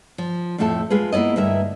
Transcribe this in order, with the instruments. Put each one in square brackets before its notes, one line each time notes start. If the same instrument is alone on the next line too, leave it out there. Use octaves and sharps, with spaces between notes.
[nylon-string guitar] F3
F2 A2 F3 A3 E5 A5
G#3 F4 G#4 B4
A#3 B3 E4 D5 D#5
D2 G2 E4 A#4 E5